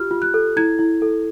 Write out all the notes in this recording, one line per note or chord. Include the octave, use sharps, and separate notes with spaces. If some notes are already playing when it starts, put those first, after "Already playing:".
Already playing: F4 G4 F6
F4
F#6
A4
E4 G#6
E4
A4